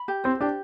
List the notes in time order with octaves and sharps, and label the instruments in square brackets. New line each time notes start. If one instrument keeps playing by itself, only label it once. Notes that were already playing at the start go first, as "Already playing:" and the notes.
Already playing: [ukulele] B5
G4
[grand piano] C4 [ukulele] C5
[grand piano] D4 [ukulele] G4